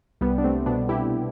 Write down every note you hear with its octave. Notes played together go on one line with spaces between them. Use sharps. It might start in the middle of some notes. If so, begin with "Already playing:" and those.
C2 G3 B3
D4
A3 C4
B2 B3 D4
E4 G4